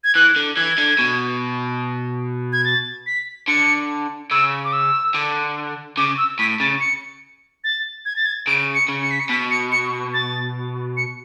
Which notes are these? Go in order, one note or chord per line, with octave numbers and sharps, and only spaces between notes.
G#6
E3 F#6
D3
E3 G#6
D3
B2
G#6
A6
B6
D3 C#7
C#3 E6
D6
E6
D3
C#3 D6
E6
A2 B6
C#3 A6
C#7
A6
G#6
A6
G#6
C#3 D7
C#7
C#3
C#7
B6
C#7
B2 B6
C#7
C#7
A6
C#7